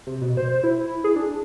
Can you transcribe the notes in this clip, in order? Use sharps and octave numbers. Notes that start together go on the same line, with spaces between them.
C3
B2
C5
E4
G#4
D4